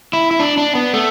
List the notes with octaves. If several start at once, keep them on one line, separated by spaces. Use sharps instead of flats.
E4
E4
D4
D4
B3
A3